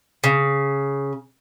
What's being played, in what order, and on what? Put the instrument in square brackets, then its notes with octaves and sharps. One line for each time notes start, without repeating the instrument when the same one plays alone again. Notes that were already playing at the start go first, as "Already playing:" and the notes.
[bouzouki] C#3